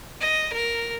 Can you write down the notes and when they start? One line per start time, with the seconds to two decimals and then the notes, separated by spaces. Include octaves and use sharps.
0.20 D#5
0.52 A#4